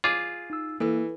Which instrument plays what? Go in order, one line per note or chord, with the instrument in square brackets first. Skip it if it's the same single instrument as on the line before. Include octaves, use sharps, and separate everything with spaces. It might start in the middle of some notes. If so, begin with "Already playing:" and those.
[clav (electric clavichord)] F4 G#4 [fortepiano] D6
[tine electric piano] D#4 E6
[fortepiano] E3 [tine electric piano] A#3 [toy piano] A4 B4